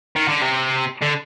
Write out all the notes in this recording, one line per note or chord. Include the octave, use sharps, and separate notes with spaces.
D#3
D3
C3
D3